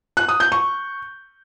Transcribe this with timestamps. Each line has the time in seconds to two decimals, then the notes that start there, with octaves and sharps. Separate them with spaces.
0.17 F#6
0.28 D#6
0.40 G6
0.52 C#6